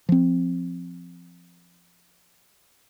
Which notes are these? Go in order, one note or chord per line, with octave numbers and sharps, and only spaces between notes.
F3 C4